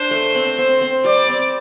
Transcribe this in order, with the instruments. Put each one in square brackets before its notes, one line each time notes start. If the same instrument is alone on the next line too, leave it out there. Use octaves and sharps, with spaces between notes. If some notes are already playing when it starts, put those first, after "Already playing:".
Already playing: [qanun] D4 [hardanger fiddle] C5
[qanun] A3
C4
C4
C4
[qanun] G3 [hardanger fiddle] D5
[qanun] C4